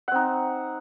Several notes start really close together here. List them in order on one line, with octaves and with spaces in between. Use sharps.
F#5 C4 D#4